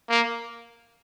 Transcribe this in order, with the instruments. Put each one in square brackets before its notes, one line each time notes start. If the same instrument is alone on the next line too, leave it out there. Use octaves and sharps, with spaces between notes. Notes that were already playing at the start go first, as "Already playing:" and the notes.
[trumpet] A#3